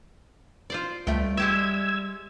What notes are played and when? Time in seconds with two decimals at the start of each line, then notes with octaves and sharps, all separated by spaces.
0.70 F4 C5 D5
1.07 C#2 G3 A3 G5
1.37 G#3 G4 E5 E6 G#6